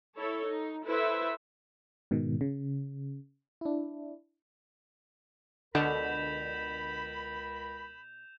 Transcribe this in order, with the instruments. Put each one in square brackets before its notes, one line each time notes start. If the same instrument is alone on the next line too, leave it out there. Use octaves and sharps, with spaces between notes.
[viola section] E4 A4 C#5
D#4
E4 A4 B4 C5 E5
[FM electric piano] G#2 B2 D#3
C#3
D4 E4
[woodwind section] C#2 A#4 B5 [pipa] B2 [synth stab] D3 [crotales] G6 E7 F7